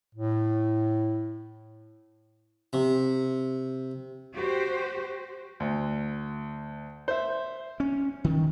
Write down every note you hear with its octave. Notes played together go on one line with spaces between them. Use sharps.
A2
C3
F#4 G4 C5
D2
C5 E5
C#4
D#3